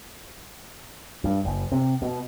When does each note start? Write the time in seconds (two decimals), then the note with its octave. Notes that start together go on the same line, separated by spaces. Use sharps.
1.24 G2
1.45 F#1
1.72 C3
2.02 B2